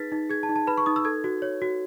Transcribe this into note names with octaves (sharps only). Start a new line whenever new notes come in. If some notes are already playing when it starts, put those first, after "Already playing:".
Already playing: D#4 G#4 B4 A6 B6
D#4
G#4 G#6
A5
D#4
A5
B4 B5
C#6
D#4 D#6
E6
A4 G#6
F#4
C#5
F#4